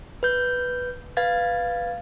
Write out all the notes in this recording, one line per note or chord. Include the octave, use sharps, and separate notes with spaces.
B4 G6
B4 F5 G#6 A6